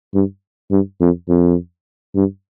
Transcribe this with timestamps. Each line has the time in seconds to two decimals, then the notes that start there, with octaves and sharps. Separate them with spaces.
0.14 G2
0.71 G2
1.00 F2
1.29 F2
2.15 G2